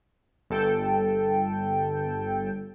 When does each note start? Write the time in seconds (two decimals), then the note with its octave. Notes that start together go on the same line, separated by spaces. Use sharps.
0.50 G1 A4 G5